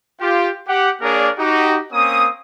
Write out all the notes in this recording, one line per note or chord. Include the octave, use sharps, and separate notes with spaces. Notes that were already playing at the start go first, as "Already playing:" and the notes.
F4 G4
G4 F#5
A#3 D4 G#4 A#4 C#5 D5
D#4 F#4 G4
A#3 C4 C#4 D#6